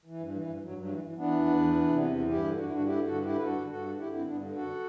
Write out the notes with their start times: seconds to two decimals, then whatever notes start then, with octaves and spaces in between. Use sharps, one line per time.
0.05 E3
0.20 G2
0.34 E3
0.47 G2
0.62 G2 F#3
0.77 G2 F#3
0.90 E3
1.04 E3
1.18 E3 B3 D4
1.32 E2
1.46 E2
1.60 E3
1.74 E3
1.88 C3
2.02 E2
2.16 E3
2.30 G2 E4 G4
2.44 D3
2.58 G2 F#4
2.66 E4
2.72 G2 D4 F#4
2.86 D3 E4 G4
3.01 G2 F#4 A4
3.14 D3
3.23 E4 G4
3.29 D3
3.36 B4
3.42 G2 F#4 A4
3.57 G2
3.70 G2 F#4 A4
3.85 D3
3.99 D3 E4 G4
4.13 G2 C4 E4
4.27 G2 B3 D4
4.41 D3
4.55 F#2 F#4 A4